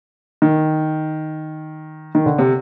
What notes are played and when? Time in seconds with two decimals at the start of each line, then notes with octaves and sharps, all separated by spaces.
0.42 D#3
2.15 D#3
2.26 D3
2.38 C3